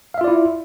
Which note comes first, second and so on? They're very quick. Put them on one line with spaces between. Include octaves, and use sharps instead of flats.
F5 E5 F4 D5 E4